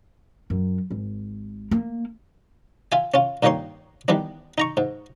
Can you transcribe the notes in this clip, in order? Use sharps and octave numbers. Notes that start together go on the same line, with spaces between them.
F#2
G#1
A#3
F4 E5 G#5
C#4 F4
G2 A#2 D#3 D#4 C#5 C6
D#3 E3 G3 B3 D4
D#4 A#5 C#6
G#2